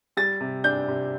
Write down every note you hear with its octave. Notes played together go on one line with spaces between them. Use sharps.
G3 A6
C3
D4 G6
C3